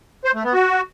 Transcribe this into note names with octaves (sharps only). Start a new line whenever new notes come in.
C5
A3
B3
F#4